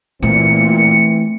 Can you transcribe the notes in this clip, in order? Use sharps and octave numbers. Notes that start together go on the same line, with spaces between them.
A#2 E3 A3 C4 C#7